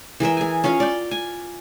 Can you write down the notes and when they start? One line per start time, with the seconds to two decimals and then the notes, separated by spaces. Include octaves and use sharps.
0.20 E3 G#4 A#4 E5
0.37 G#4 G#5
0.64 C#4 F4 C#5 F5
0.80 D5 G5
1.11 G#5